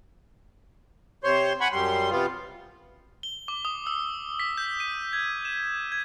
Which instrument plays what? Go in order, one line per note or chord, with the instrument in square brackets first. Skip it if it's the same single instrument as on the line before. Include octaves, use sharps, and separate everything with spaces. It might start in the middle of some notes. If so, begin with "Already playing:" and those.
[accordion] C3 C5 C#5 C6
F#5 G#5 B5 C#6
F#2 G3 C6
C3 B3 F4
[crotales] G7
D6
D#6
E6
B6
G6
D#7
G#6
E7
G#6